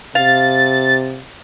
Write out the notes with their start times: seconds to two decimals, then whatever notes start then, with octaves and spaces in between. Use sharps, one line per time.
0.15 C3 F5 A6